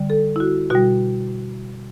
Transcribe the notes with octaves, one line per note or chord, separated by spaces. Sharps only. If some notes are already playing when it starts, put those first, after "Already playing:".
Already playing: D3 G3
A4
E4
F#4
B2 G3 F#4